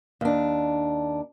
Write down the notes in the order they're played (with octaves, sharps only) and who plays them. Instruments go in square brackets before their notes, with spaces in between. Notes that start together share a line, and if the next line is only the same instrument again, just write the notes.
[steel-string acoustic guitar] D#2 D4